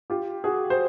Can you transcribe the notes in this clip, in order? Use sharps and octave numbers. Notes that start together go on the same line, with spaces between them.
F4 G4
F#4 G#4
C5